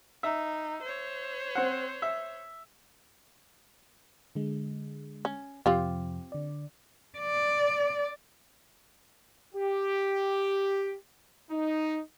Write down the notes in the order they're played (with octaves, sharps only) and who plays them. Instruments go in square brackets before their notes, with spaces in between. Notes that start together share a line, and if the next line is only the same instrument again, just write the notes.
[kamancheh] D#4 [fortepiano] E5
[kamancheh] C5 C#5
[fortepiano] C4 F#5
E5
[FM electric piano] D3 G#3
[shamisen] C#4
[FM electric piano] F2 C3 F3 [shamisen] C4 F4 G4
[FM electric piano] D3 D5
[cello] D5
[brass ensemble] G4
D#4